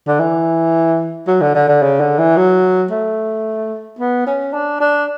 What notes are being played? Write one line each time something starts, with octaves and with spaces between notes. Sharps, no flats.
D3
E3
F#3
D3
D3
D3
C#3
D3
E3
F#3
A3
B3
C#4
D4
D4